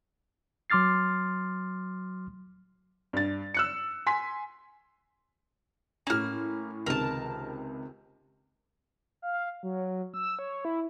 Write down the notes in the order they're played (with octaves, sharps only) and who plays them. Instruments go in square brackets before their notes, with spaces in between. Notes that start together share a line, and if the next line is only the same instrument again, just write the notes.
[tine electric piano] F#3 C6 D6 F6 A6 C7
[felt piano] G2 A6
E6 F#6 C#7
G#5 C6 B6
[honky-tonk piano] A2 C#4 [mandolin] A#3 F6
[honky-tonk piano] C#2 C3 D#3 [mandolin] A#4 A5
[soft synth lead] F5
F#3
E6
C#5
E4